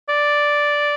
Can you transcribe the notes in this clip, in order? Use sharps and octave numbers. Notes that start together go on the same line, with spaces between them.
D5